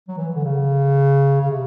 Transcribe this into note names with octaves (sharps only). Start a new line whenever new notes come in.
F#3
E3
D3
C#3
C#3
C3